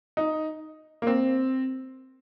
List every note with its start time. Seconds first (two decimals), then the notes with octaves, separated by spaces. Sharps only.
0.17 D#4
1.02 A#3
1.07 C4